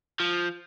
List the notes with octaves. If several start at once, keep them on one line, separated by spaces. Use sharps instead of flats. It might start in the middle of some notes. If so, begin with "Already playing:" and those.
F3